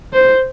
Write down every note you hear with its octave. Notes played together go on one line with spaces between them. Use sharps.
C5